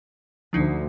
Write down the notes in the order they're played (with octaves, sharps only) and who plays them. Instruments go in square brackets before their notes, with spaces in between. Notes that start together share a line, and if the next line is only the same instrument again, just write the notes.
[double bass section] D2 [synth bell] F3 D4 D#4